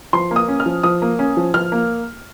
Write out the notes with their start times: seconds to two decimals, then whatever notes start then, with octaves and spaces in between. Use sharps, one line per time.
0.13 F3 C6
0.31 A#3
0.36 D#6
0.48 C#4
0.60 F6
0.66 F3
0.83 F3 D#6
1.02 A#3
1.19 C#4
1.37 F3
1.54 F3 F6
1.72 A#3